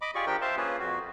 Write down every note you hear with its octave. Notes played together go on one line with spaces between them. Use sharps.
D#5 B5 D6
F4 G4 G#4 D5 C#6
F3 D4 G4 A#4 G5
C5 E5 F5 A5 C6
A#3 C#4 F4 G#4 B4
F2 F#4